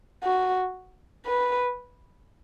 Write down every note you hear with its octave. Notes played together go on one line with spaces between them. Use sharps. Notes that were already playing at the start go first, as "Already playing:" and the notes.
F#4
B4